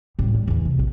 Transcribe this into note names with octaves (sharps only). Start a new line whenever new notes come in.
A2 G3
G3
E2 D3
C3
A#1